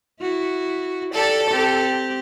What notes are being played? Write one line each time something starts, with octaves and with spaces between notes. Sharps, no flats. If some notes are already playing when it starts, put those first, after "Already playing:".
E4 F#4
G4 A4 D5
C4 G4